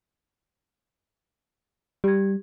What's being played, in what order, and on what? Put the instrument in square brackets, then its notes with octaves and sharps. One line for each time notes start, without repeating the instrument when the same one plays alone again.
[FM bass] G3 [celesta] G4 G#6